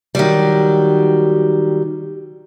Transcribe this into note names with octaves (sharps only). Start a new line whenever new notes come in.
D#3 F#3 G3